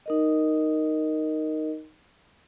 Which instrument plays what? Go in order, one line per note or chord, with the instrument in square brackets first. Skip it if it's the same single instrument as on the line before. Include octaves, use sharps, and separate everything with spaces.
[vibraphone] D#4 A#4 D#5